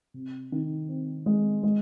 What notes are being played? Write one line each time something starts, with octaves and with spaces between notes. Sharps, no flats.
C3
D#3
C4
G#3
G#3